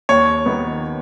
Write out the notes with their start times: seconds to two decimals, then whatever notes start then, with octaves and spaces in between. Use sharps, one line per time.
0.09 D#2 C#5
0.46 D#3 B3